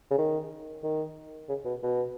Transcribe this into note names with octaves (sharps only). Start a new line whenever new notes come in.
C#3
D#3
D#3
C#3
B2
B2